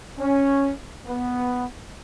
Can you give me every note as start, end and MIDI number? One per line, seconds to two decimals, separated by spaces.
0.18 0.72 61
1.07 1.65 59